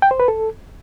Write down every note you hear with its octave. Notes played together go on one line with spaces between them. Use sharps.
G5
C5
B4
A4